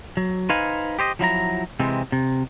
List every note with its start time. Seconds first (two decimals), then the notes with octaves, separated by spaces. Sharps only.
0.17 F#3
0.49 D#4 B4 C5 F5 G#5
0.99 G4 C5 D#5
1.19 F3 F#3 E4 A#5
1.80 C3 E3 G#3 C4
2.12 C3